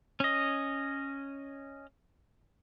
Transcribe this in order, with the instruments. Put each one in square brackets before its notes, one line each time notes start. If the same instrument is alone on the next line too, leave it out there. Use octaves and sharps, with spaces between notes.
[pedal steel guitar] C#4 D#5